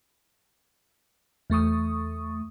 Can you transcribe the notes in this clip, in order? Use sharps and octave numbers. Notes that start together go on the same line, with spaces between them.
E2 A3 C#6 D#6